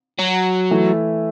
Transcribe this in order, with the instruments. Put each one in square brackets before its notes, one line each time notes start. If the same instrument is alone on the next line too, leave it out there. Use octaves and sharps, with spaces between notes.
[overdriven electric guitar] F#3
[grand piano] E3 A3 E4